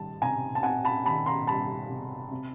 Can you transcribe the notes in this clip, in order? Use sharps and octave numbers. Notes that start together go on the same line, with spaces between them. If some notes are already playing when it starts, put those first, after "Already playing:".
Already playing: D#3 G3 A5
C3 G#5 A#5
A5
C3 F#5 G#5
A5 B5
D#3 A5 B5
A#5 C6
G3 A5 B5
C3
C3